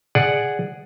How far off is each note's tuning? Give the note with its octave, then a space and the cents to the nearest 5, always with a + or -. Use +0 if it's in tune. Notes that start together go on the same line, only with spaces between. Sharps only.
G#4 -5 D5 +0 F#5 +0